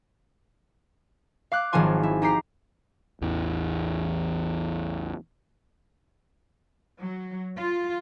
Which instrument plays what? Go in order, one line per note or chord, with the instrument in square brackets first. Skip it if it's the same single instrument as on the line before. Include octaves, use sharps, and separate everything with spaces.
[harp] F5 D6 F#6
G#1 F3 F#3 F4 G#5 C6
E4
D#4 G4 A#5 C7
[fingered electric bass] A1 E2 E3
[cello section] F#3
F4